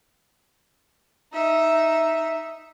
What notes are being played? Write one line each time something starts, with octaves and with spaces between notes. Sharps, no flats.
D#4 E5